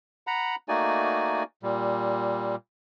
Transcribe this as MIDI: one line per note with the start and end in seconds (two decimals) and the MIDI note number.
0.27 0.55 78
0.27 0.55 82
0.27 0.55 83
0.69 1.43 57
0.69 1.43 58
0.69 1.43 63
0.69 1.43 66
0.69 1.43 74
0.69 1.43 80
1.63 2.56 46
1.63 2.56 55